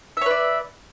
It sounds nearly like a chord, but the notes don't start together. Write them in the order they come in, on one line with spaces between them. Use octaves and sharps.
E5 C#5 B4 D5